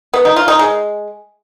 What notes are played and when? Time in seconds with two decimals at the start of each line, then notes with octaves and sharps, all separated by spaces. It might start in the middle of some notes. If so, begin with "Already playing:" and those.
0.14 B3
0.25 D#4
0.36 F4
0.48 D#4
0.59 G#3